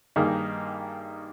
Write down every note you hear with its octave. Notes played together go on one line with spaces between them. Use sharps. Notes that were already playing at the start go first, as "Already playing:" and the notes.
G2 D#3 A#3 D#4 G#4